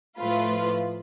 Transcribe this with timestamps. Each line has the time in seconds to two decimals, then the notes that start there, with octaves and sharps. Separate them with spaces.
0.18 A2 F3 A3 F4 B4